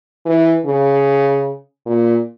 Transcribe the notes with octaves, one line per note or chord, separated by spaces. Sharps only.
E3
C#3
A#2